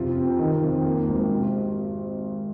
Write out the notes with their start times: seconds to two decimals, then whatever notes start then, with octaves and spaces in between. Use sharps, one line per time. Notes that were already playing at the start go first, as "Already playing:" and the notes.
Already playing: F2 C3 F4
0.17 C4
0.39 D#3
0.63 F2
0.85 A#3
1.08 G#1
1.30 C3